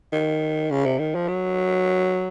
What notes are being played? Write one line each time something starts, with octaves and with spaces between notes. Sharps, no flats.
D#3
C#3
C3
D#3
F3
F#3